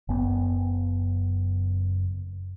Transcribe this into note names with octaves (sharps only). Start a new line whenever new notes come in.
F#1 F#2 B3